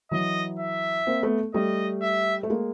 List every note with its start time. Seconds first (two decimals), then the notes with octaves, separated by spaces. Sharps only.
0.11 E3 F#3 D#5
0.59 E5
1.07 A#3 C4
1.23 A3 B3
1.54 G3 A3 D#5
2.02 E5
2.43 A3
2.50 G#3 A#3